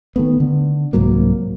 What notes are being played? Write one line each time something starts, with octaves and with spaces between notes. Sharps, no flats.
D#3 A3 B3
D3
C2 G#2 F#3 A#3